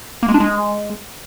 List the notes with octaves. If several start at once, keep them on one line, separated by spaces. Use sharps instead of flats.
A#3
G#3
D4
G#3